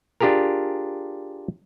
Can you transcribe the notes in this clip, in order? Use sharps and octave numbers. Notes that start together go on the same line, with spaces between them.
D4 F4 G4 G#4 A#4